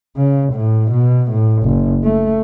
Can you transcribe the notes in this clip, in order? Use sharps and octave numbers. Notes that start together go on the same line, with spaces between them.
C#3
A2
B2
A2
F#1
A3